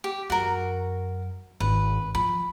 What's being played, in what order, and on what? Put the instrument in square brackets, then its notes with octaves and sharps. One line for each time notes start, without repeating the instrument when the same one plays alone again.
[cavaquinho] G4
[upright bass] F#2 [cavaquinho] F#4 A#4
[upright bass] G#1 [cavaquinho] B4
[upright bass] F3 [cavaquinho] B5